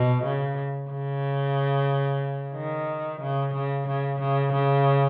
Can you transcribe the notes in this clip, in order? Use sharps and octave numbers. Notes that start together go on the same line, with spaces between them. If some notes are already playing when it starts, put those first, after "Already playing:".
Already playing: B2
C#3
C#3
D#3
C#3
C#3
C#3
C#3
C#3